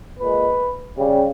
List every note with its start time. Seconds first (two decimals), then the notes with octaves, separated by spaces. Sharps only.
0.20 A#2 G#3 B4
0.97 C#3 G3